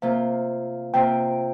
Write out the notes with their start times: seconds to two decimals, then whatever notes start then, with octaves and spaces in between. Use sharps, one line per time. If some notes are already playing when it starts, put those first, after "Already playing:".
0.02 C3 A#3 F4 F5
0.94 C3 A#3 F4 G5